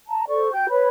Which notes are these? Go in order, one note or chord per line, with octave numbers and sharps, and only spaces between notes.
A5 A#5
A4 C5 D5 C#6
F#4 G5 G6
B4 C#5 B5